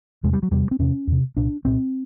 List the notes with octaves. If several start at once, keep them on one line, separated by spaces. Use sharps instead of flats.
E2 C3 G#3
G3
F#3
E2 C3 G3
C4
E2 C3 C#4
E2 C3
C2 A#2 D4
C2 A#2 C4